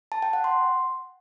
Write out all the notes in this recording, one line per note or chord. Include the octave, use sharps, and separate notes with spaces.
A5
G5
F#5
C6